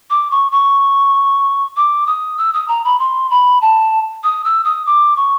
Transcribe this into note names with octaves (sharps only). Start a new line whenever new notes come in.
D6
C#6
C#6
D6
D#6
E6
D#6
A#5
B5
C6
B5
A5
D#6
E6
D#6
D6
C#6